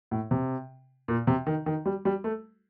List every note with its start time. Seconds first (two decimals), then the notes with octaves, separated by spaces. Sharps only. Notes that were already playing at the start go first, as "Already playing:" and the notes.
0.11 A2
0.31 C3
1.08 A#2
1.27 C3
1.47 D#3
1.66 D#3
1.86 G3
2.05 G3
2.24 A3